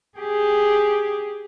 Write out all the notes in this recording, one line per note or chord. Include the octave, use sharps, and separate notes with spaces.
G4 G#4